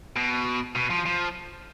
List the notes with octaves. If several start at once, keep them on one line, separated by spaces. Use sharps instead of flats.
B2
B2
F3
F3